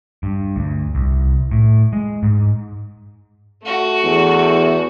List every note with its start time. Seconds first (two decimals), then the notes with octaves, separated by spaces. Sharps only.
0.23 G2
0.56 D2
0.95 C2
1.52 A2
1.93 G#3
2.23 G#2
3.64 A3 F#4
4.04 E2